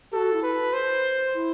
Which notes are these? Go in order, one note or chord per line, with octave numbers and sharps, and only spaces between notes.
F#4 G4 A4
E4
B4
C5
E4